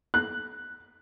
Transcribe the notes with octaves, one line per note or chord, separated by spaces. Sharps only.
F#6